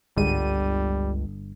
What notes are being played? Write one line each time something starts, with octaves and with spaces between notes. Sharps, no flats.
G1 C#2 G#2 D3 G3 G#3 D#7